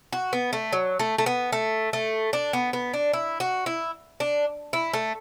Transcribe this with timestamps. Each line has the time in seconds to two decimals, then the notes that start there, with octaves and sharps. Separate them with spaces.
0.13 F#4
0.33 B3
0.53 A3
0.73 F#3
0.99 A3
1.18 A3
1.26 B3
1.52 A3
1.93 A3
2.33 D4
2.53 B3
2.73 B3
2.93 D4
3.13 E4
3.40 F#4
3.66 E4
4.20 D4
4.73 E4
4.93 A3